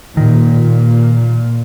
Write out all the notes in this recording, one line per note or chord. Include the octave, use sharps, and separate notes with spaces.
A#2 D#3